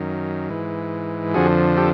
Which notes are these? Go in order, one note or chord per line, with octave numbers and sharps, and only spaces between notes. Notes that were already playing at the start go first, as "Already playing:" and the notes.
Already playing: F#2 D#3
G#2 E3
F2 D3 F3 F#4 G#4
G4 A4